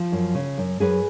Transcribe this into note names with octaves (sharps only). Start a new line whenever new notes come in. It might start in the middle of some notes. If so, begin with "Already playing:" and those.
Already playing: F3 F4
F#2
C#3
F#2
F#2 G#4 B4